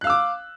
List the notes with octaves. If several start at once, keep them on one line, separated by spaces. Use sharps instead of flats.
F5 D6 E6 F#6